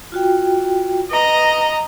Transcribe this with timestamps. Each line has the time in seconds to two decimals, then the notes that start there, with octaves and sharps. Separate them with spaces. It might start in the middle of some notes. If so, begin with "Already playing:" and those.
0.12 F4 F#4 G5
1.11 B4 D#5 A#5